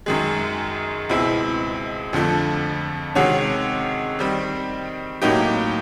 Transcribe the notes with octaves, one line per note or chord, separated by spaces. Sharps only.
F#2 D#3 G#3
C#2 B2 G#3 C4 E4
F2 D3 F3 A3
C3 D#3 G#3 C#4 F#4
D#3 G3 C4
A2 F#3 A#3 D#4 G4